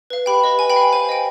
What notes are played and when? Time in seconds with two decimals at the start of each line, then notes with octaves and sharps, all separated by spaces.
0.10 B4 F5
0.26 G4 G5 B5
0.44 B4 D#5
0.59 B4 G#5
0.70 G5 B5
0.76 F5
0.81 G5
0.93 C5 G#5
1.09 D#5 G5